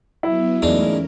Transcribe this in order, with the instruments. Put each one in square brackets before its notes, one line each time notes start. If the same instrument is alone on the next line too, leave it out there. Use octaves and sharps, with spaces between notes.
[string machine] F#3 B3 [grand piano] E4
[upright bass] E2 [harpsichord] G#2 D4 [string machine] A3 C#4 A#4